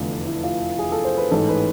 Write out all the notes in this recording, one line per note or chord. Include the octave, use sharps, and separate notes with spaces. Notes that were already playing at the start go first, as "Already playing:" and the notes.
Already playing: F1 E2 D3 A3 F4
E4
F4
G#4
A4
C5
B4
A1 G#2 G#3 A4
B4